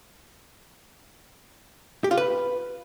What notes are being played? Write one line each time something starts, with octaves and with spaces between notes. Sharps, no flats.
G4
F4
B4